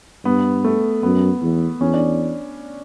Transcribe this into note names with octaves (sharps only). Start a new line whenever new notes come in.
G2 B3
A3
F#2 B3
E2
E2 C#4
D4